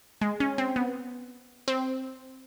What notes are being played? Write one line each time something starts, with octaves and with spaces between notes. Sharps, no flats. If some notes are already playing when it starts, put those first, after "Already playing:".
G#3
C#4
C4
B3
C4